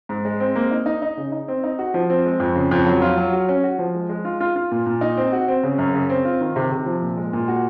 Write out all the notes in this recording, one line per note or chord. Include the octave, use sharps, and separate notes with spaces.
G#2
G#3
C4
A#3
D#4
D#4
D#4
C#3
D#4
C4
D#4
F#4
F3
C4
G#3
F2
C#3
F2
F#3
F4
F#3
F#4
C#4
F#4
F3
G#3
G#3
F4
F4
F4
A#2
A#2
D#4
C4
F#4
C4
C#3
F#2
C#3
C4
F4
D#3
C3
C3
F3
A#2
G#3
A#2
F#4